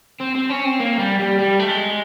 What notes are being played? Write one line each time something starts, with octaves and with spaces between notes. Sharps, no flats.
C4
C4
C#4
C4
A#3
G3
G3
G3
A3
G#3